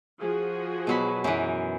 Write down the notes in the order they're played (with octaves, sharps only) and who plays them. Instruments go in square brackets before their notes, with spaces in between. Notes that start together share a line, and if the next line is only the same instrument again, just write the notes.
[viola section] F3 F#4 G#4
[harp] B2 F#3 B5
F#2 E3